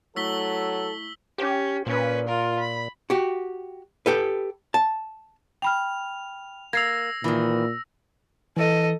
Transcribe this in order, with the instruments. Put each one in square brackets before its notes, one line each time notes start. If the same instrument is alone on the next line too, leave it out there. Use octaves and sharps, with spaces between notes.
[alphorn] F#3 [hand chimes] A3 E4 C#6 [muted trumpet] A4 [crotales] E6 B6 G7
[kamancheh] C#4 [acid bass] G4
[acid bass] A#2 [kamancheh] C#4 B4
[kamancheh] F4 A#4
B5
[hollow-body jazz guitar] F#4 G4
G4 A4 B4
A5
[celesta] G5 B5 F6 [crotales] F7
[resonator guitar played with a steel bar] A#3 [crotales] E6 A#6 [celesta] G#6 C7 F7
[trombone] A#2 [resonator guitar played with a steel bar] D#3 E3
[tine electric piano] E3 [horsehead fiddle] A4 D#5